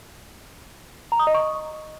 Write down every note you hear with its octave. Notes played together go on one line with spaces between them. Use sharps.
A#5
D#6
D#5
C#6